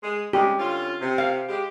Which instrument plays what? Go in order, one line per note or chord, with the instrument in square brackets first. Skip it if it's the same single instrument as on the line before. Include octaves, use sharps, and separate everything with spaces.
[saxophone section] G#3 G#4
[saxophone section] C#3 G#3 [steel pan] G4
[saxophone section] D3 C#4 F4
C3
[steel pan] F5
[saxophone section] G#3 G4